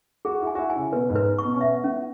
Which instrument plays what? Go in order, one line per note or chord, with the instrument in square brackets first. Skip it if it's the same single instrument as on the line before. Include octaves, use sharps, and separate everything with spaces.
[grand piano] F#4 [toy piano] G#4
[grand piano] E4
[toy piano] G#5
[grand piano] F#4
E4
[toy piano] G#5
[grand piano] C#3
[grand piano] B2 [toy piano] B4
[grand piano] G#2
[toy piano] B4
C#6
[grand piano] B2
C#4
[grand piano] B3 [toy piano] E5
[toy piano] C#4